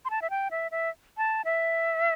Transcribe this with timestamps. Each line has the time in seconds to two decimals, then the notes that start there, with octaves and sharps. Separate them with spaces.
0.05 C6
0.10 A5
0.22 E5
0.30 G5
0.51 E5
0.71 E5
1.17 A5
1.45 E5